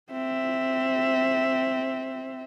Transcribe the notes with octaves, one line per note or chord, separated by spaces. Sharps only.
C4 E5